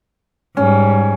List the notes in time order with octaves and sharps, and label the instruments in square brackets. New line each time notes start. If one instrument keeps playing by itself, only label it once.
[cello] G#2 G3 [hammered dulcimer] C#4